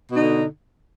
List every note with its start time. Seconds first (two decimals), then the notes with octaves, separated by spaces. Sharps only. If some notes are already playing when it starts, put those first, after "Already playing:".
0.12 B2
0.16 D#4
0.20 D3